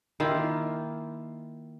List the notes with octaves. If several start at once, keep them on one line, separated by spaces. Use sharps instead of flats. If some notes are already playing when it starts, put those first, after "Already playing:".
D#3 A#3 E4 F4